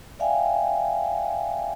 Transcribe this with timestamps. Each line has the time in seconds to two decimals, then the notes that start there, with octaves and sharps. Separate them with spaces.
0.19 D5 E5 F5 G5 G#5